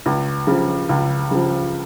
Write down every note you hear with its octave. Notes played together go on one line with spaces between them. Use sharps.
C#2
C#3 F3
C#2
C#3 F3